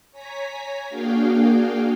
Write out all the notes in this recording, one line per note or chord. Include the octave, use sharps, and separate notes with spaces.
C#5 G#5 A#5 B6
A#3 D4 F#4 G#4 F5 G5